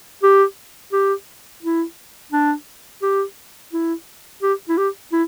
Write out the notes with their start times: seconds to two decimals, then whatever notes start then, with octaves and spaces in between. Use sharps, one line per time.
0.23 G4
0.92 G4
1.63 E4
2.32 D4
3.02 G4
3.72 E4
4.42 G4
4.69 E4
4.78 G4
5.12 E4